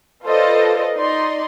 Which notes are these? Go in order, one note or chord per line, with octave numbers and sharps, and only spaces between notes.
F4 A4 B4 C5 D5 D#5
D#4 D5 D#5 C6